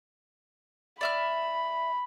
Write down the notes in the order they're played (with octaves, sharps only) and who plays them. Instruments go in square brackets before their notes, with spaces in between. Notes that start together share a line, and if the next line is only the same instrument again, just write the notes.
[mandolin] D5 E5 F6 [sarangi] B5